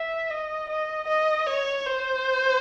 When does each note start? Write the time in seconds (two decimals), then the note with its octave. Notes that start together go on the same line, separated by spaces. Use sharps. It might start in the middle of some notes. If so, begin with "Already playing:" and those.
Already playing: E5
0.30 D#5
0.69 D#5
1.08 D#5
1.46 C#5
1.86 C5